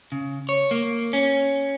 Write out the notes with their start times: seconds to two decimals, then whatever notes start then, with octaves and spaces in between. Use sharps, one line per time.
0.12 C#3
0.49 C#5
0.71 A#3
1.13 C#4